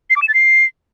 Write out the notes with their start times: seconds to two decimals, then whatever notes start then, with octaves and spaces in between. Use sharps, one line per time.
0.10 C7
0.16 D6
0.22 E7
0.28 A6
0.34 C7